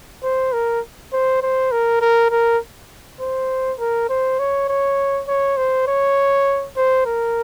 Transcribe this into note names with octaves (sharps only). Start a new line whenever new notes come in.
C5
A#4
C5
C5
A#4
A#4
A#4
C5
A#4
C5
C#5
C#5
C#5
C5
C#5
C5
A#4